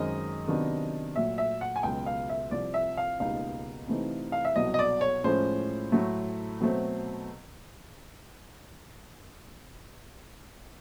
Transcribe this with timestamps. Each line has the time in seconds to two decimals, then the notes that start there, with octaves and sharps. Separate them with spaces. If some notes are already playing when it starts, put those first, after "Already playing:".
Already playing: F#2 D#3 G#3 C4 D#5
0.47 C3 D#3 F#3 B3 D4
1.16 A#2 F#3 A3 E5
1.38 E5
1.61 F#5
1.76 G#5
1.83 C#2 B2 F#3 G5
2.06 F5
2.29 E5
2.51 C2 C3 F3 D5
2.74 E5
2.97 F5
3.20 C#2 B2 G3 A#3 D#4 F5
3.88 C3 E3 A3 C4 D#4
4.32 F5
4.45 E5
4.56 C2 B2 F#3 D#5
4.74 D#5
4.79 D5
5.01 C#5
5.24 A2 F3 G#3 C#4 C5
5.92 A2 F#3 A3
6.61 B2 F#3 A3 C4